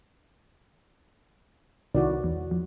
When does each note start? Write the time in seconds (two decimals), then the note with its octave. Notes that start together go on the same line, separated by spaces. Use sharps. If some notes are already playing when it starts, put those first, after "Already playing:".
1.95 C2 D#3 E4 F#4 D5
2.24 E2
2.51 F2